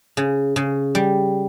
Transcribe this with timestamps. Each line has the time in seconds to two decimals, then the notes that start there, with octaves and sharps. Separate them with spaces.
0.17 C#3
0.56 C#3
0.95 G3